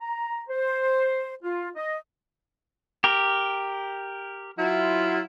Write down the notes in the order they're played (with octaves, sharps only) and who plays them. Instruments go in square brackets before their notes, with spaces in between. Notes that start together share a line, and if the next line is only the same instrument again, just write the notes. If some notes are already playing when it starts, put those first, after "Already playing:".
[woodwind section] A#5
C5
F4
D#5
[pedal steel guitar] G4 A#4
[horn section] F#3 E4 F4